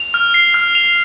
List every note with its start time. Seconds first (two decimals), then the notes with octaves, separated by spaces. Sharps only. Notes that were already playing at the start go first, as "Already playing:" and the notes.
Already playing: F7
0.14 F6
0.34 C7
0.54 F6
0.75 F7